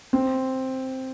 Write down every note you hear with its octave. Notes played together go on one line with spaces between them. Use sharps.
C4